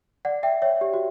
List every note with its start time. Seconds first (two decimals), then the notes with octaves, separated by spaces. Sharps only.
0.25 D5 F#5
0.43 E5 G5
0.62 C#5 E5
0.81 G4
0.94 F#4